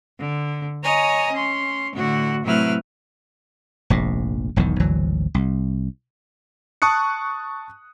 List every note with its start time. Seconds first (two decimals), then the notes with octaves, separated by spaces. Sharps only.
0.19 D3
0.83 C#5 D#5 G#5 A#5
1.31 C#4 C6
1.94 A2 D3 F#4
2.44 A2 C3 F#3 E4 B4 F6
3.90 F1 A#1 G#2
4.56 E1 B1 E2 D#3
4.80 G#1 D2 E3 F#3
5.34 C2
6.82 A5 C#6 D#6 F#6 C#7